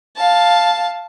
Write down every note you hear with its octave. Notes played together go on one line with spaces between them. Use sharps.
F5 A5